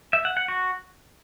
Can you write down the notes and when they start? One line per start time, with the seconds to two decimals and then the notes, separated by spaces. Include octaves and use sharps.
0.13 E5
0.25 F#5
0.37 F#5
0.48 F#4